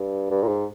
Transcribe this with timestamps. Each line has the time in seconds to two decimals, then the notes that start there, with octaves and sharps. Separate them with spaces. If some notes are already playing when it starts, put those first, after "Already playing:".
Already playing: G2
0.30 G2
0.43 A#2
0.47 G#2